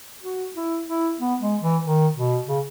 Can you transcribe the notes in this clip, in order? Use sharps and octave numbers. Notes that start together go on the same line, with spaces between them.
F#4
E4
E4
B3
G#3
E3
D#3
B2
C#3